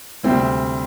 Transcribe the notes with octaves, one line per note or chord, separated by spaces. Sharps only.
D2 C3 G3 C4